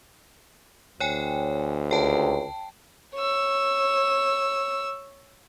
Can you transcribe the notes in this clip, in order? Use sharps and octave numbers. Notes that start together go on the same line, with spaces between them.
D2 C#5 G5 G#5
C#2 G5 A5
C#5 E6